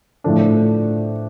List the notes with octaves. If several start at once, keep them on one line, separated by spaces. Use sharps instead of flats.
A2 F3 A3 D4